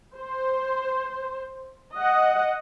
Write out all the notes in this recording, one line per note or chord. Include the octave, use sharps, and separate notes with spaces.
C5
D#5 F#5